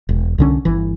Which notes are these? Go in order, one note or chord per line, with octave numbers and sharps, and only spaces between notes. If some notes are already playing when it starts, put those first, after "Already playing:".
E1
C2 D3 C#4
G1 E3